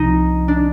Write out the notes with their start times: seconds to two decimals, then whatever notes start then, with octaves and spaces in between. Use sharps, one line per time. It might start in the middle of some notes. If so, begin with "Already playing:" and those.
Already playing: C2 C3 F3 D#4
0.48 D4